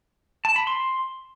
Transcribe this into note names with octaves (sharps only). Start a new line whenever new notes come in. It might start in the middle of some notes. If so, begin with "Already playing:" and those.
A5
B5
C6